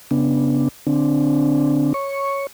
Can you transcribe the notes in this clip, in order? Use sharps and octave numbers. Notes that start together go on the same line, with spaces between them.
C#3 B3 D4
D3 C4 D4
C#5 C#6